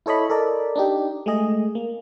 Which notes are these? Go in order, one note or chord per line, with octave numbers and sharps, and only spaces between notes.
E4 A4 C#5 D#5 B5
A4 A#4 D5 D#5
D4 D#4 G4
G#3 A3 G#4 D#5
A#3